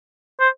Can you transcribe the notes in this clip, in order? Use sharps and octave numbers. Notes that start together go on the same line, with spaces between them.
C5